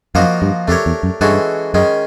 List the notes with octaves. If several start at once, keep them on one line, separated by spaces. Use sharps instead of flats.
F#2 F3 A#3 D#4 F#4 A#4
G2
F2 A3 D4 G4 A#4 C#5
E2
F#2
G2 E3 G#3 C#4 F#4 A4
F#2 D#3 G#3 C#4